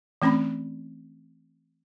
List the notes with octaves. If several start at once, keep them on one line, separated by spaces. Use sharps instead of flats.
E3 A3 C4 C#4 B5